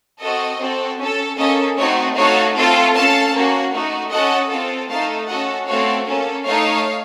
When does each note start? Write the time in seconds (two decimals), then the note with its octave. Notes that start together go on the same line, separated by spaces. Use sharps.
0.20 C4 F#4 A4 D#5
0.59 C4 F#4 A4
0.98 C#4 A4
1.37 A#3 C#4 A4 D#5
1.77 A3 C4 D#4 F#4 C#5
2.16 A3 D#4 F#4 A4 C#5 F5
2.55 A3 C4 F4 A4
2.93 C#4 A4 F5 A5
3.33 A#3 C#4 F#4
3.73 A3 D#4 F#4
4.11 C#4 F#4 A4 D#5 F#5
4.50 C4 F4 A4
4.89 A3 D#4 A4 F5 A5
5.28 C#4 F#4 A4 D#5 F#5
5.67 A3 C4 F#4 A4 C#5 F5
6.07 A#3 C#4 A4
6.45 A3 D#4 A4 C#5 F5